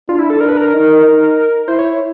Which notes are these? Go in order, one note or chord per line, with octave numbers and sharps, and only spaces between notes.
D4 F4
E4
A4
D4 A#4
B4
A#4
D#4
D#4
E4 C5
C#5